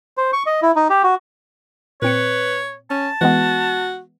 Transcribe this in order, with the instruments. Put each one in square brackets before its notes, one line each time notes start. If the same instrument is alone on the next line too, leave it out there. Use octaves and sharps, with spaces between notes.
[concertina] C5
C#6
D#5
E4
D#4
G4
F#4
[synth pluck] A#2 C4 C#7 [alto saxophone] B4 [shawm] C#5
[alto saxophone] C#4 [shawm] A5
[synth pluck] E3 G#3 B3 [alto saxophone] F#4